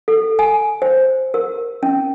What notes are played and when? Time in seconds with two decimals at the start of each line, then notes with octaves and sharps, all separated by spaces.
0.08 A4
0.39 G#5
0.82 C5
1.34 A#4
1.83 C#4